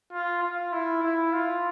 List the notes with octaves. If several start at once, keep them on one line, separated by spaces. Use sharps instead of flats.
F4
F4
E4
E4
F4